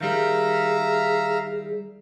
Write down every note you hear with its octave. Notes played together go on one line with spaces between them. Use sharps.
D#3 G3 G#4 E5 F5 A#5